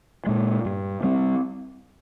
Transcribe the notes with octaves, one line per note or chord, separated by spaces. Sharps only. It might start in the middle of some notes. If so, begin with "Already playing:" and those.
A#2 G#3
G2
G3 C4